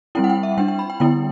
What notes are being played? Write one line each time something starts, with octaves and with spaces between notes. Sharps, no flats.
G3 C4 E4 G5
F#5
G5
E5
G3 D4 G5
G5
B5
G5
D3 G3 B3 E4 G5